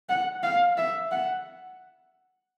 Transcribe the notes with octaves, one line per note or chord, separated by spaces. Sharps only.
F#5
F5
E5
F#5